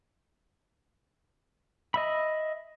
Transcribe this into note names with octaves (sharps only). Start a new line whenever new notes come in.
D#5 E5 B5